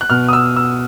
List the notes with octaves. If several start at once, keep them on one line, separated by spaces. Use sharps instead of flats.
F#6
B2 F6
D#6
E6
E6